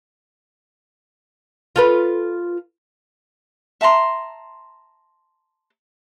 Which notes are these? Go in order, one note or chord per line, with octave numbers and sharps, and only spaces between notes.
F4 A4 B4
E5 A5 A#5 C6